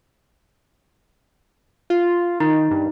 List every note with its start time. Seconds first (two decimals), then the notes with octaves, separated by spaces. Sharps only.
1.90 F4
2.40 D#3 D#4
2.71 G2